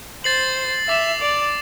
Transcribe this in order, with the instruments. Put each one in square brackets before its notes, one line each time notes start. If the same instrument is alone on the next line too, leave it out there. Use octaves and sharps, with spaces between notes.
[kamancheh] C5 [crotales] A6 C7 F#7
[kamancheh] E5 [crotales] D6 A6 E7
[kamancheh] D5